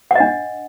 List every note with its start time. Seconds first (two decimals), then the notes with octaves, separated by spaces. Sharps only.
0.11 F#5
0.15 D#5
0.20 D4